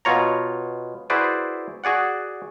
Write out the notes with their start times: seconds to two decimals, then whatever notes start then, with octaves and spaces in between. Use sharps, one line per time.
0.05 B2 F4 C#5 A#5
1.10 E4 F#4 G#4 B4 C5 D5
1.84 F#4 G#4 D5 F#5